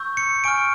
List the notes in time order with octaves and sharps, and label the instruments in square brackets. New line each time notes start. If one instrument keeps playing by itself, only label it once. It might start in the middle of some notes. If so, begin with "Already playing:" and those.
Already playing: [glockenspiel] C#6 E6 G6
C#7
G#5 C#6 F6 D7